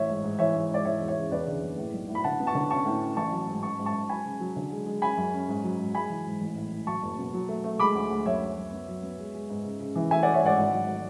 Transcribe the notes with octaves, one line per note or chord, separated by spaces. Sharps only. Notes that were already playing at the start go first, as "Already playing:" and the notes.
Already playing: A1 C#5 E5
G#2
G#2
E3 C#5 E5
G#2
G#2 D5
E3 C#5 E5
E2
C#5 E5
C#3
E2 B4 D5
D3
F#1
A2
B1
A2
B5
D3 F#5 A5
B3
A5 C#6
D3
C#4 A5 C#6
A2
C#4
A1 A5 C#6
F#3
G#2
C#4 A5 C#6
G#2
A5 C#6
G#2
F#3 G#5 B5
C#3
F#3
D3
G#3
G#3
C#4 G#5 B5
F#2
C#4
G#2
F#3
G#2
G#3 G#5 B5
E3
G#2
A1
A2
A1
F#3 A5 C#6
F#1
B2
F#3
A3
A3
G#3 B5 D6
D2
D2
F#2 C#5 E5
F#2
F#2
B3
F#3
B3
G#3
G#3
G#2
C#3
C#3
E3
A3 E5 G#5
A3 D5 F#5
C#5 E5
G#2 D5 F#5
G#1
F#3
A3